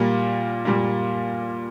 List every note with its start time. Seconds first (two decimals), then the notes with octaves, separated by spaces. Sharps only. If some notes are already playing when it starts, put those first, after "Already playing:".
Already playing: A#2 G3 A#3
0.65 A#2 G3 A#3